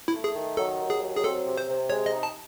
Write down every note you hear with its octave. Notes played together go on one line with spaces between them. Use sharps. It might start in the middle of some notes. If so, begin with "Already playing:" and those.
E4
A3
G#4
D#3
F#3 A4
D#2
G#4
F#3
G#4
C4 A4
C3
C5
C3
G#3 C#5
D#5
D#4
A5